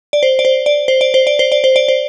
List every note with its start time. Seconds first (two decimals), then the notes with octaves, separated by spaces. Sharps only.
0.13 D5
0.23 C5
0.39 D5
0.45 C5
0.66 D5
0.88 C5
1.01 D5
1.14 C5
1.27 D5
1.39 C5
1.52 D5
1.64 C5
1.76 D5
1.88 C5